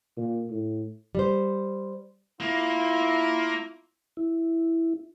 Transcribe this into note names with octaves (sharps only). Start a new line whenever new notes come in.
A#2
A2
G3 C5
A#3 E4 F4
E4